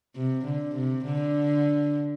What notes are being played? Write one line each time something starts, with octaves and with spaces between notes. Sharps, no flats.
C3
D3
C3
D3